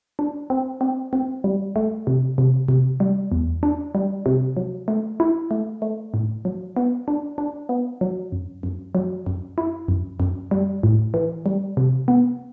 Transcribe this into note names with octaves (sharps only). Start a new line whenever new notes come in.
D4
C4
C4
C4
G3
A3
C3
C3
C3
G3
E2
D4
G3
C3
F#3
A3
E4
A3
A3
A2
F#3
B3
D4
D4
B3
F#3
F#2
F#2
F#3
F#2
E4
F#2
F#2
G3
A2
E3
G3
C3
B3